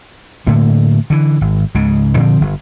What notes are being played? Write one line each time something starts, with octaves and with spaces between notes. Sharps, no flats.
A2 D3 A3 A#3
D3 E3
G#1
C#2 G#2 C#3
A#2 D3 F3 C4
G1